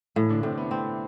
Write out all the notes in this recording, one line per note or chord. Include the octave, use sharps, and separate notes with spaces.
A2 E3 E4
D3 D4
A2 C3 C4
B3
A3 C4